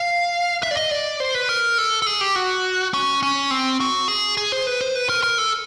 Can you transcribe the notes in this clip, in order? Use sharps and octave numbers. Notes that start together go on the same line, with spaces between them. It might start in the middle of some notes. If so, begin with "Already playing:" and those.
Already playing: F5
E5
D5
D#5
D5
C5
B4
A#4
A4
A4
G#4
G4
F#4
C#4
C#4
C4
F#4
G#4
G#4
C5
B4
C5
B4
A#4
A#4
A4